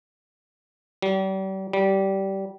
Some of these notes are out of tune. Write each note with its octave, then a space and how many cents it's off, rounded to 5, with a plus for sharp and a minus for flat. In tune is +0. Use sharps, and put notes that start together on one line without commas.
G3 -40
G3 -20